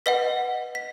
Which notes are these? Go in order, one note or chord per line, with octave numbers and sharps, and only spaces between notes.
B4 D#5 F#5 B6
B6